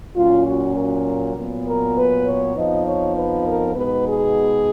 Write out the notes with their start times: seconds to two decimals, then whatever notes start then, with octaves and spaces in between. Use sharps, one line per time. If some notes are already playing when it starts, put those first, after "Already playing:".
0.16 A#2 F#3 C#4 F4
0.46 F#4
0.75 A#4
1.35 A#2 F#3 B3
1.66 A#4
1.96 B4
2.25 C#5
2.56 F2 F3 B3 D#4 D#5
2.85 C#5
3.15 B4
3.45 A#4
3.75 B2 G#3 B3 D#4 B4
4.06 G#4